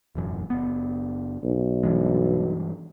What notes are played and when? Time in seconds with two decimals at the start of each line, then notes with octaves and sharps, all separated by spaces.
0.15 E1 A1 F#2
0.50 F#1 B3
1.44 B1
1.83 G2 E3 G#3